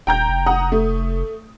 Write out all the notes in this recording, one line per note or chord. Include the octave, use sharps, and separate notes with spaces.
D#1 G5 A#5 G6
F1
F#5 A#5 D#6
A3